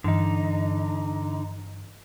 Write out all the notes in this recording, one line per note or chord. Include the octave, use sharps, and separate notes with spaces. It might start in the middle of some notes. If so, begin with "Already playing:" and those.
G2 D3 E3 D#4